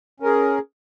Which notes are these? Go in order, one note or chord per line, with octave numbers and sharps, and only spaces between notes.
C#4 G#4 A#4